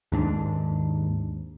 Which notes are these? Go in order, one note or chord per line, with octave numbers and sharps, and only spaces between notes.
D#2 G#2 D4